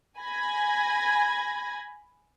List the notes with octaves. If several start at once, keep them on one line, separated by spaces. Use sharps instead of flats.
G#5 B5 G#6 A#6